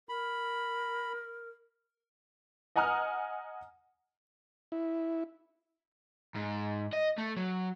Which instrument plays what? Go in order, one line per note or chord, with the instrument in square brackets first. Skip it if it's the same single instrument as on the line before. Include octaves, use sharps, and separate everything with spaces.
[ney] A#4 [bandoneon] B5
[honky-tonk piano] D#5 F#5 G#5 A#5 D#6 F6
[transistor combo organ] E4
[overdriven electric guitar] G#2
D#5
A3
F#3